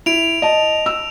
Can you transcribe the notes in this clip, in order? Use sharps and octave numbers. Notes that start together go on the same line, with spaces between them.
E4 D7 F7
D#5 A5
E6